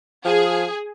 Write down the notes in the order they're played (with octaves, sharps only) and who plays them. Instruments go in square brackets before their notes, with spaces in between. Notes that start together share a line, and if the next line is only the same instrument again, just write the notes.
[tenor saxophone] F3 [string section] G#4